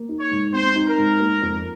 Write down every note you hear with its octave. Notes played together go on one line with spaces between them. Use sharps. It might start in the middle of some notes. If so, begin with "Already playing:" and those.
Already playing: A#3
D#4
C#5
G#2
C4 C5
D#4
A#4
G#2
A#3
F2